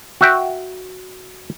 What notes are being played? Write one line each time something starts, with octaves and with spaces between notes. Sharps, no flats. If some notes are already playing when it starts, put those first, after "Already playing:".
F#4 E5 G5